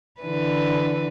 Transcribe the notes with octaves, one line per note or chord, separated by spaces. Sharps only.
D3 E3 B4